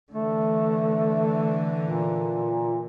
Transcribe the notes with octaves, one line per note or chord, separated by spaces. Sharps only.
D3 E3 A3
A#2